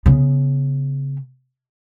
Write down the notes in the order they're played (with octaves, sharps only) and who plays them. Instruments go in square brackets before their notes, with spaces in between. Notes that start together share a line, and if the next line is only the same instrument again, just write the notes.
[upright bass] C#3 B3